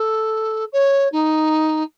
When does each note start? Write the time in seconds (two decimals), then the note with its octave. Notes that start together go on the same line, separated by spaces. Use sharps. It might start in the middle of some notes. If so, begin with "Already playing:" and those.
Already playing: A4
0.72 C#5
1.12 D#4